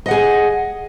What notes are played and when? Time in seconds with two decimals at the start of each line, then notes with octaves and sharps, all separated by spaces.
0.06 D#5
0.08 F#5
0.11 G#4